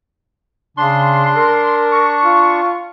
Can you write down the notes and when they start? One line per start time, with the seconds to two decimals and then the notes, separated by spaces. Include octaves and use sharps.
0.77 C#3 D4 C6
1.36 A#4
1.92 C#6
2.24 F4